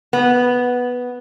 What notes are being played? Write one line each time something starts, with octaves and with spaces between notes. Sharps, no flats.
B3